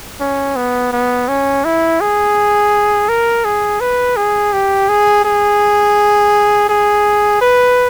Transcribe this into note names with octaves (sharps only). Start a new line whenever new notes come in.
C#4
B3
B3
C#4
E4
G#4
A#4
G#4
B4
G#4
G4
G#4
G#4
G#4
B4